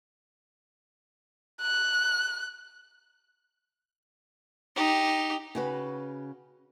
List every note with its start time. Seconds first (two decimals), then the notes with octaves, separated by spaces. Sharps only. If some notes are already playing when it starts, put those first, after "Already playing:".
1.61 F#6
4.76 D#4 G4
5.55 C#3 F#4 B4